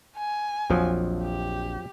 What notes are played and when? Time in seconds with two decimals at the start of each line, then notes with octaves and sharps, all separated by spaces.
0.17 G#5
0.70 A#1 F2 F3 F#3
1.23 G4